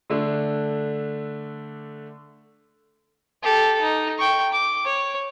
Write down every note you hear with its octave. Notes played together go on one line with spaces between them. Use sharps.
D3 A3 D4
G4 A4
D#4
G5 C#6
D6
C#5